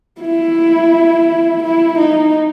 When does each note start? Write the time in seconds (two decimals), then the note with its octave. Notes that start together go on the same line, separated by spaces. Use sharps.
0.21 E4
1.63 E4
1.98 D#4